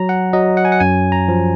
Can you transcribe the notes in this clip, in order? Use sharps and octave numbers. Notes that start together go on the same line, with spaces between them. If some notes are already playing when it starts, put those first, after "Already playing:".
Already playing: F#3 A#5
F#5
F#3 D#5
F#5
G#5
F#5
F#2 G#5
A#5
F3